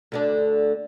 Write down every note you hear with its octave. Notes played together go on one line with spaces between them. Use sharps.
D2 D3 D4